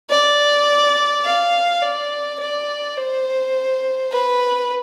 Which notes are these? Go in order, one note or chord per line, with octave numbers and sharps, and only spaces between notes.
D5
F5
D5
D5
C5
B4